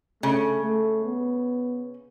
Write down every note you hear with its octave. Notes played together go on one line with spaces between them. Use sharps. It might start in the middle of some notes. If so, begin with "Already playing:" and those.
C#3 A3
A3
B3